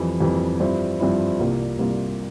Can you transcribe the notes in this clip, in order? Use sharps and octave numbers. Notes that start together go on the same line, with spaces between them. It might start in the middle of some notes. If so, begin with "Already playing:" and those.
Already playing: F2 E3 G3
F2 E3 G3
G2 F3 C4 E4
G2 F3 C4 E4
C2 C3 G3 A#3 F4
C2 C3 G3 A#3 F4